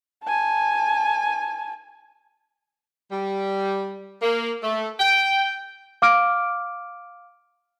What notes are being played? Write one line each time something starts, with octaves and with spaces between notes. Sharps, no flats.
G#5 A5
G3
A#3
A3
G5
F5 D6 F6 D7